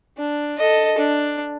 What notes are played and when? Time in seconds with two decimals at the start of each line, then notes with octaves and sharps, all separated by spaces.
0.18 D4
0.58 A4 D#5
0.98 D4